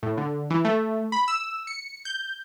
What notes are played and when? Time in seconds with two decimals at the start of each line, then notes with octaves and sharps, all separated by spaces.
0.03 A2
0.18 D3
0.50 E3
0.65 A3
1.12 B5
1.28 E6
1.67 C#7
2.05 G6